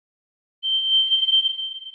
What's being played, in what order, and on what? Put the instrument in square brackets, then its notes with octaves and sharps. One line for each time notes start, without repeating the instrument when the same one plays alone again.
[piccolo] G7